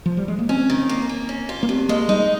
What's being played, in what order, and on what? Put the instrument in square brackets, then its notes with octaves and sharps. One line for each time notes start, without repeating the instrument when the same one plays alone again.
[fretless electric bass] F3
G3
G#3
A#3
[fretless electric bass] C4 [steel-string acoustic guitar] C#4
[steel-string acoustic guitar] D#3
A#3
A#3
C#4
F4
[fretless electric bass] A#3
[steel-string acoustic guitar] G2 [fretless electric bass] C4
[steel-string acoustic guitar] G#3 [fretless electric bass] A#3
[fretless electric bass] G3 [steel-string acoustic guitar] D#4